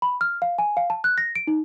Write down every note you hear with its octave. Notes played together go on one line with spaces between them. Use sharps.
B5
F6
F5
G#5
F5
A5
F#6
A#6
D7
D#4